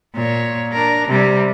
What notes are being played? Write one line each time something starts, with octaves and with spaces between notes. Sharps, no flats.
A#2 C#5
D4 A#4
C3 G3